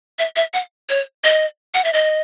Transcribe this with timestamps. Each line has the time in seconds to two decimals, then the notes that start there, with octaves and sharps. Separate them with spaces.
0.19 E5
0.36 E5
0.54 F#5
0.89 C#5
1.24 D#5
1.74 F#5
1.84 E5
1.93 D#5